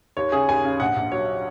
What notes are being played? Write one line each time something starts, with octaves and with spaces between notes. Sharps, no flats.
D#2 C#5
C#3 G#4
D#2 G#5
C#3
A#1 F#5
A#1
F#3 C#5